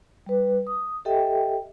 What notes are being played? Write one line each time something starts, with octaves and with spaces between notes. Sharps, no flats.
G3 B4
D#6
G4 A4 D#5 E5 G5